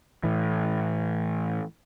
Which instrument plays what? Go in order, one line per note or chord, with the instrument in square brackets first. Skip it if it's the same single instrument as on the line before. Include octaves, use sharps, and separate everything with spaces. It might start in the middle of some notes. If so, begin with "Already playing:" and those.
[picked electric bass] A2 E3